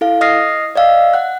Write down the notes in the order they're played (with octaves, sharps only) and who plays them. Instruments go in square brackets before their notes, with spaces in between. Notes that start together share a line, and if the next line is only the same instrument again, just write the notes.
[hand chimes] E4 A4 F5
D#5 D#6 F6 A#6 C7
D5 D#5 F5 E6
F#5 F#6